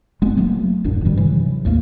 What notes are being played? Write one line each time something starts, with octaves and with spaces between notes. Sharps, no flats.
F#1 G#3 B3 C4
F#3 A3 A#3
D#1 A1 F#2 D4
G2 D#3 G3
C3 E3 F#3
A1 D#2 A3 A#3